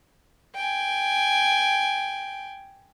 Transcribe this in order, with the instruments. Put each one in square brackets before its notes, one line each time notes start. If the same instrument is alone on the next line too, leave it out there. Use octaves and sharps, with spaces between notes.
[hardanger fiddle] G5 G#5